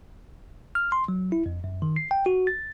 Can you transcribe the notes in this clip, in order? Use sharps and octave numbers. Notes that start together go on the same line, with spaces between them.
F6
C6
F#3
E4
F2
F#2
D#3
C7
G5
F#4
A6